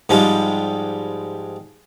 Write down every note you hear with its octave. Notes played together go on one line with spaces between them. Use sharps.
G#2 F3 G3 G#3